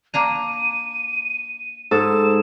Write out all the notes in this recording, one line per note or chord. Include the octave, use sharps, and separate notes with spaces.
A#3 D4 A#5 D#7
G#2 A4 E7